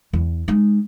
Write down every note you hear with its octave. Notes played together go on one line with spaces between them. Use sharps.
E2
G#3 D#4